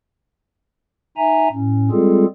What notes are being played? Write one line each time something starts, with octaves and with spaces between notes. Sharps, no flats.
D#4 E5 G#5 A#5
A2 C#4
G3 G#3 C4 F4 G#4 A4